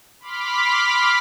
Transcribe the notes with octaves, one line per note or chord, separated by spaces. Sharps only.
B5 C6 D6 F6 B6